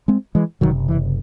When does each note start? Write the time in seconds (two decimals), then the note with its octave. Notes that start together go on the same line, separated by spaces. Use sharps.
0.08 G#3 C4
0.35 E3 G#3
0.61 F#1 E2 C3 D#3 F#3
0.88 E3